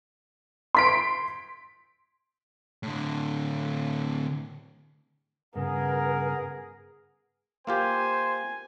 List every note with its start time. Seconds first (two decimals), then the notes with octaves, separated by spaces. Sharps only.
0.75 C6 B6 D7
2.83 A2 D3
5.55 G2 C#3 B3 G#4 A#4
7.67 A#3 F4 G4 C5 G#5